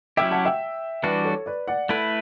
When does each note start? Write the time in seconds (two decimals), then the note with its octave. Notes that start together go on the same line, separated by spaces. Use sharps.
0.17 F#3 C#4 E4 G4 E5 G5
0.31 F#5 A5
0.45 E5 G5
1.03 E3 G3 D4 F#4 B4 D5
1.24 A4 C#5
1.46 B4 D5
1.68 D5 F#5
1.89 A3 E4 A4 B4